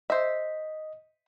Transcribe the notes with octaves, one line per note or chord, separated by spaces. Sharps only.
C5 D#5 E5